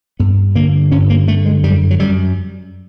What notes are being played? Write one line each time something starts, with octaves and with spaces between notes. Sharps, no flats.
G2 B3
D3 A#3
G2 C#4
A#3
D3 A3
G#3
F#2 G3
F#3
F#2 G3